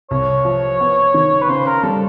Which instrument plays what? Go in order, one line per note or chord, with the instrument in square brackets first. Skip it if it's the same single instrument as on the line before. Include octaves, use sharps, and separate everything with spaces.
[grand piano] C2 [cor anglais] C#5
[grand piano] F3
B3
D#3
[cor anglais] B4
[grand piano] C#3 [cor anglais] C5
[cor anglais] A#4
[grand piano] G3 [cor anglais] A4